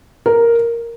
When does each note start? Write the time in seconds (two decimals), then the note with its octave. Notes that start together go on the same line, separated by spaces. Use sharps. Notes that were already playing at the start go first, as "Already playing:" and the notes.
0.26 A#4